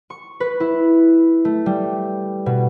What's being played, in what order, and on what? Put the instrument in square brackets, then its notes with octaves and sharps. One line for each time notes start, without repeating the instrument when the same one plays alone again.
[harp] C#6
B4
E4
A3
G3
B2